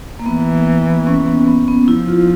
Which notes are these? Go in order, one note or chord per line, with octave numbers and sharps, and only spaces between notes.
A#3
E3 B3
C#4
B3
B3
B3
F3 E4
F4